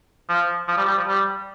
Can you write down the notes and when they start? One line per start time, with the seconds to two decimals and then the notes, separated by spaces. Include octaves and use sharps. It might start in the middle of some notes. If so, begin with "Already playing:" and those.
0.29 F3
0.68 F3
0.77 G3
0.88 G3
0.98 F3
1.08 G3